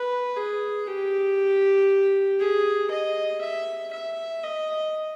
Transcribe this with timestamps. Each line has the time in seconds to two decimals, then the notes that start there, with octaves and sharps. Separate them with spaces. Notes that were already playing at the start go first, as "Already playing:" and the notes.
Already playing: B4
0.36 G#4
0.87 G4
2.40 G#4
2.90 D#5
3.41 E5
3.93 E5
4.44 D#5